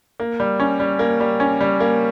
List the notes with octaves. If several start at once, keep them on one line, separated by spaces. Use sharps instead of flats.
A#3
G3
C#4
G3
A#3
G3
C#4
G3
A#3